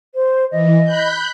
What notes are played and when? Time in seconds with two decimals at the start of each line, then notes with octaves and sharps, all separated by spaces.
0.15 C5
0.51 E3 D#5
0.84 B5 F#6 G6